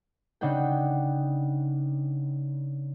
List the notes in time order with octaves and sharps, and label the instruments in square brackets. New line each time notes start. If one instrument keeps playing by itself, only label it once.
[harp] C#3 D4 D#4 F#5 G5